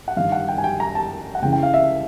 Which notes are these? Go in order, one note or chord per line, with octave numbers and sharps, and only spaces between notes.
F#5
G2 D#3 F5
F#5
G5
G#5
G5
A#5
A5
F#5
C#2 C#3 E3 G5
G5
F5
E5